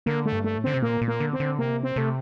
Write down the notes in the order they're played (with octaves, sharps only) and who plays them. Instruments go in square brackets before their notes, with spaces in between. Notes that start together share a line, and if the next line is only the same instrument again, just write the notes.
[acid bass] D3 [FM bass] A#3
[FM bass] A3
[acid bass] G2
[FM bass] A3
[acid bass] A2
[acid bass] D3 [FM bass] C4
[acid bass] C3
[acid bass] A#2 [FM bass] A#3
[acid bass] A#2
[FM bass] A#3
[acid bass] D3
[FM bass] C4
[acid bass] D3
[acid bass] C3 [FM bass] A#3
[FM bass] C4
[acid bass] C3 [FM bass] A3